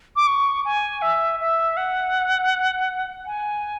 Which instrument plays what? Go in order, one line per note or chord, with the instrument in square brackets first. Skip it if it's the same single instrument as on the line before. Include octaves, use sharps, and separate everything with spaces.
[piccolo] D6
C#6
G#5
E5
E5
F#5
G#5